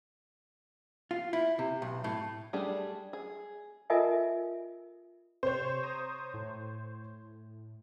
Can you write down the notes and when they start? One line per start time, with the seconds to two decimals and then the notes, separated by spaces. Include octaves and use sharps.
1.11 F4
1.33 E4
1.59 C3
1.82 B1
2.04 A2
2.53 G3 A3 D4 G4 G#4
3.13 G#4
3.90 F4 A4 A#4 D#5 E5 G#5
5.43 C3 C5 C#5 C6
5.83 A#5 D#6
6.34 A2